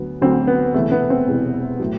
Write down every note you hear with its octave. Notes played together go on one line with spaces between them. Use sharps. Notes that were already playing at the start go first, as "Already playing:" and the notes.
Already playing: D2 D3 F#3 B3
D2 D3 F#3 C4
B3
E1 E2 C3 E3 A3
B3
C4
E1 E2 C3 E3
A2 F#3